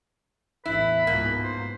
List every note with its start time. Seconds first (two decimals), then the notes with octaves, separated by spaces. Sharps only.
0.66 A1 E2 E4 B4
1.07 C#2 G#2 B2 A#3
1.43 C5